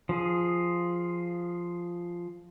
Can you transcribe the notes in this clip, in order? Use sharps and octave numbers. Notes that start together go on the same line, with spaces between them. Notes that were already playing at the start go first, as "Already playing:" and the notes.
F3 G#4